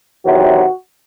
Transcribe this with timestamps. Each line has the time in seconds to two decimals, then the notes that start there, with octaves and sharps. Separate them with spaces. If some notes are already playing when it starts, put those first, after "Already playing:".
0.25 E2 C3 D#3 F#3 F#4